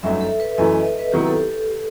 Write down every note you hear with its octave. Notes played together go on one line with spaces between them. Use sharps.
G1 F#2 F#3 A3 D#4 E5
A4
B4
F#2 E3 A3 E4 D#5
D#5
D#5
B4
C3 D#3 F#3 B3 E4 G4
A4